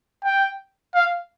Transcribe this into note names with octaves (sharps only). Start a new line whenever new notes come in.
G5
F5